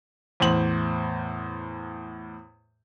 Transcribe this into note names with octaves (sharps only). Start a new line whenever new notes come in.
E2 A2 C5 F#7